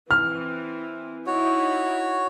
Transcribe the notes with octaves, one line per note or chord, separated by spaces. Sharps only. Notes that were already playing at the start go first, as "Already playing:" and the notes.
E3 C4 F6
D#4 E4 F#4 C#5